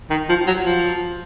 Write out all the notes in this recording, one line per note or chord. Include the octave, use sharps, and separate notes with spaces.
D#3
F3
F#3
F3